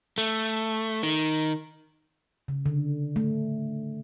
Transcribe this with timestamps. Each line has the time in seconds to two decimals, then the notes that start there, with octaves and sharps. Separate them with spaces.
0.18 A3
1.03 D#3
2.48 C#3
2.66 D3
3.16 A3